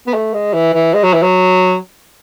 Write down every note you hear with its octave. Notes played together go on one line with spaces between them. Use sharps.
B3
A3
G#3
E3
E3
G#3
F#3
E3
F#3